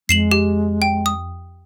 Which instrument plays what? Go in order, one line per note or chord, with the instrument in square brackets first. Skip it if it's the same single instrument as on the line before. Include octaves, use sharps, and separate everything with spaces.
[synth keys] F2 [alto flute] G#3 [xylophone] C7 E7 F#7
[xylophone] G4
G5
D#6